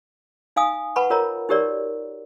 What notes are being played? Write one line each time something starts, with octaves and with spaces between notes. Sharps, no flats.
D#4 F5 G#5 D#6
B4 F#5 A5 B5 C#6
F4 A#4 C#5 D#5 A#5
D#4 F#4 G4 A#4 C#5 D5